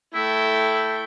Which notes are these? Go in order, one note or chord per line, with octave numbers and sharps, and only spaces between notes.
A3 E4 G5